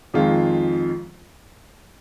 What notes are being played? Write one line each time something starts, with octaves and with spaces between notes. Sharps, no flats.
F2 D#3 G#3 F4